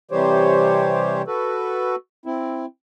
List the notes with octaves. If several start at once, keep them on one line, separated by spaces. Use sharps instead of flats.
C3 E3 G3 G4 C5 C#5
F#4 A4 B4
C4 E4